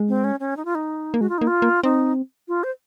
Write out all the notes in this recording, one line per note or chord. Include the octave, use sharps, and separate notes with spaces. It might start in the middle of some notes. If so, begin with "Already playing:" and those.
Already playing: G#3
C4
C#4
C#4
D#4
F4
D#4
A#3
G#3 F#4
F4
A#3 D#4
F4
A#3
C4 D#4
F4
C5